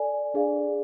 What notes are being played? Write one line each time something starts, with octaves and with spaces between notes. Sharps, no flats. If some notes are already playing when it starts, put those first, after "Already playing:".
Already playing: A4 D5 G#5
D4 G#4 D5 F5